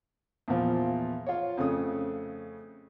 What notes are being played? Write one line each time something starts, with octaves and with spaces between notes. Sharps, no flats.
E2 A#2 F3
F4 C#5
F2 C#3 A3 D#6